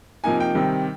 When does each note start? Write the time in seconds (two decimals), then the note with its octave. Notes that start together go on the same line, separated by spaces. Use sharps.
0.24 C3 F3 A#3 D#4 G#5
0.40 G5
0.55 C3 D#3 G3 C4